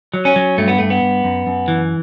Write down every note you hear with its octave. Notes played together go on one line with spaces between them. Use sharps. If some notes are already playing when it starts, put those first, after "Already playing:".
F#3
C#4
F#3
G2 A3
B3
G2 A3
B3
G2
F#2
F#2
E3